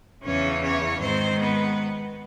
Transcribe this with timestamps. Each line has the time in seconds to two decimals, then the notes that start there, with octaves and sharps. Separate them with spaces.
0.24 E2 C#3 E3 C#4 C#5
0.63 C#4 C#5
1.00 G#2 D#3 G#3 C4 C5
1.40 B3 B4